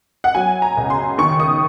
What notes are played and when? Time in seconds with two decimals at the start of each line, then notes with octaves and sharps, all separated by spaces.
0.24 F#5
0.35 F#3 G#5
0.62 A#5
0.77 C#2
0.90 C6
1.18 D#3 C#6
1.40 D#6